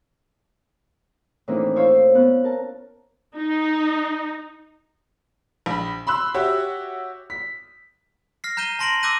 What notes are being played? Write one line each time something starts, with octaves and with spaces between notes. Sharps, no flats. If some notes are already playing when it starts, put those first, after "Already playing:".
A2 D#3 E3 A#3 C4 D4
E4 F4 C5 C#5
B3 C#4 F#6
A#4 A5
D#4
A#1 B5
B5 C6 E6 F#6
F#4 G4 C#5 E5
B6
F6 A#6 C7
A#5 G6 D#7 E7 G7
A5 A#5 C6 A#6 D7 F#7
D6 E6 F#6 G6 A#6 D#7